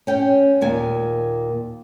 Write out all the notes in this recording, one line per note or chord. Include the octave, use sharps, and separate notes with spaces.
C#4 G5
D#2 A#2 G#5